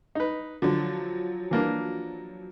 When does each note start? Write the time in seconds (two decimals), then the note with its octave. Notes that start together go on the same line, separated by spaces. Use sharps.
0.15 D#4 B4
0.62 D3 F3 F#3
1.51 E3 A#3 D4